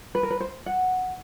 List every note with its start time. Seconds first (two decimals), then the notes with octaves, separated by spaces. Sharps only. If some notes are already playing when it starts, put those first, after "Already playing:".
0.15 B4
0.23 A#4
0.30 B4
0.40 C5
0.66 F#5